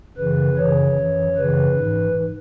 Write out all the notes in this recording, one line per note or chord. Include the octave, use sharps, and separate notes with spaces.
F#2 C#3 E3 B4
F#2 C#3 E3 C#5
F#2 E3
F#2 C#3 E3 B4
G#2 E3